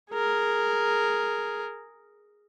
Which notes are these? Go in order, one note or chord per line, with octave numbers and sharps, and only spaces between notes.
G#4 A#4